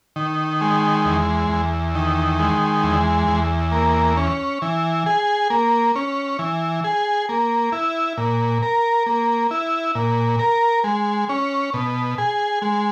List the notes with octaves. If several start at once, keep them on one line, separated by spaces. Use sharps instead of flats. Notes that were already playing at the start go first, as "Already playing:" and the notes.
D#3
G#3
E2
E2
D#3
G#3
E2
E2
A#3
C#4
E3
G#4
A#3
C#4
E3
G#4
A#3
E4
A#2
A#4
A#3
E4
A#2
A#4
G#3
C#4
B2
G#4
G#3